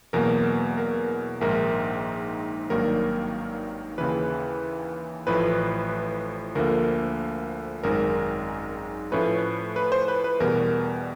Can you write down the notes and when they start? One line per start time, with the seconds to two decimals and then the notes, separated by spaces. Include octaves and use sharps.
0.13 E2 B2 F#3 A#3 A#4
0.77 A#4
1.41 A#1 G#2 D#3 A#4
2.70 G#1 G2 D#3 F#3 A#3 A#4
3.98 D#2 C#3 E3 B4
5.27 A1 A2 F3 B4
6.55 D2 D3 F3 A#3 A#4
7.83 G#1 F#2 D#3 G#3 A#4
9.12 A2 F3 A3 C#4 B4
9.76 B4
9.92 C5
10.08 B4
10.24 B4
10.40 E2 B2 G3 A#4